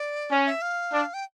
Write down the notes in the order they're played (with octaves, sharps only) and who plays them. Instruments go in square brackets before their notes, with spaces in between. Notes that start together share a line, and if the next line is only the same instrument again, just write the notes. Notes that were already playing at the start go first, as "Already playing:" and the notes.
Already playing: [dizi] D5
[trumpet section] C#4
[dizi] E5
F5
[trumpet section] D4
[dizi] G5